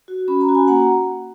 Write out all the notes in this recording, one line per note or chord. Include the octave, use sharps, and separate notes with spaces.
F#4
C#4 B5
A#5
F#4
G#5
A#3 F#5 A#5